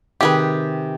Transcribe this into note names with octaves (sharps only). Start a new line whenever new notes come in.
C3 D#3 G4 G#4 B4